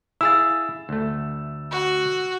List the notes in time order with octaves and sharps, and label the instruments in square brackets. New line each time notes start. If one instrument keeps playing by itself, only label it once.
[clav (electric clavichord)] E4 G#4 F5 [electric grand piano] E6 A6
[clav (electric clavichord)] D2 A3
[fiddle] F#4